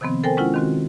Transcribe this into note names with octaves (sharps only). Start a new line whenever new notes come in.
C3 D#3 F3 B3 C4
A4 A#4 C5 G5 G#5
G#3 C#4 E4 F4 F#5
D#3 C4 F#4